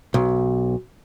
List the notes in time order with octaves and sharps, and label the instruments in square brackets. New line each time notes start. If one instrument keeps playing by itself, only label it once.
[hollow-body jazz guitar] B1